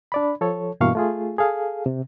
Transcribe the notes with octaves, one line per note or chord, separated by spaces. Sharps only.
D4 D5 B5
F3 A4 C#5
G2 B2 E3 A#3 F5 C#6
A3 F4 G#4
G#4 A4 F5
C3